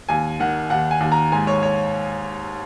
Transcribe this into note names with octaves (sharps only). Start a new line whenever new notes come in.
D#2 G#5
D#3 F#5
D#2 F#5
G#5
D#2
A#5
G#2 G#5
C#5
C#5